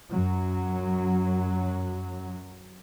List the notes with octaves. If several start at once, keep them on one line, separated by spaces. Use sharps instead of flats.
F#2 F#3